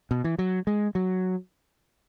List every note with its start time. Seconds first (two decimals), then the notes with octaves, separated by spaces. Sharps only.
0.11 B2
0.24 E3
0.39 F#3
0.67 G#3
0.95 F#3